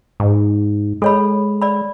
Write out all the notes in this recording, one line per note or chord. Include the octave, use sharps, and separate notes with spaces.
G#2
G#3 A4 C#5 B5
D5 B5